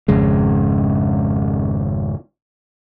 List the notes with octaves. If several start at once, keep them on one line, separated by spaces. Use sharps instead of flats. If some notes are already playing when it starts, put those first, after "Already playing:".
G#1 F2 C#3 G#3